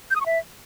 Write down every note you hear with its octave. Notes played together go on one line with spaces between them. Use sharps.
G6
D#6
C#6
E5